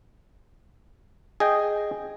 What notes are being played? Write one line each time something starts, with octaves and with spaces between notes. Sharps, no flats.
G#4 D#5 G5